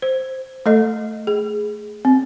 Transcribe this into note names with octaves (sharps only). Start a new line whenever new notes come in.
C5
A3 A4 D#5
G#4
C4